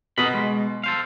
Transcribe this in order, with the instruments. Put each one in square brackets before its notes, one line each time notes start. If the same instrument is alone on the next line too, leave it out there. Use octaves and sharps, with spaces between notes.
[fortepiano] B2 [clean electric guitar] A#4 D#5 B5
[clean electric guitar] G#3
A4 C5 F5